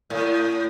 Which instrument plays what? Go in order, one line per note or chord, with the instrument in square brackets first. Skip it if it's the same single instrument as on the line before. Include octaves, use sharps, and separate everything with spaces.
[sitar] A2